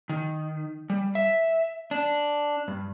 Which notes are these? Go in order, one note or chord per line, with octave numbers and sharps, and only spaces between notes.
D#3
G3
E5
D4
G2